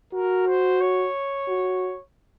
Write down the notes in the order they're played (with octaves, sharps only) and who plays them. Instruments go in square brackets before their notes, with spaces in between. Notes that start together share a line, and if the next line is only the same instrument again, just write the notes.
[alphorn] F#4 [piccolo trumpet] A#4
[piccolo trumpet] C5
C#5
[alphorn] F#4